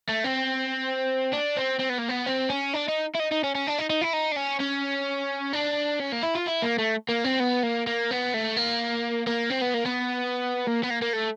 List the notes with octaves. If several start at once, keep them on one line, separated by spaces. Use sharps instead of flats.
A3
C4
D4
C4
C4
B3
A#3
B3
C4
C#4
D4
D#4
E4
D#4
D#4
C#4
C#4
D4
D#4
D#4
E4
D#4
D4
C#4
C#4
D4
C#4
A#3
E4
F4
E4
A#3
A3
A#3
C4
B3
A#3
A#3
B3
A3
A#3
A#3
C4
B3
A#3
B3
A#3
B3
A#3
A#3
A3